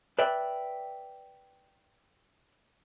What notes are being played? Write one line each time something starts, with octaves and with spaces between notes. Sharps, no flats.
B4 D5 E5 G5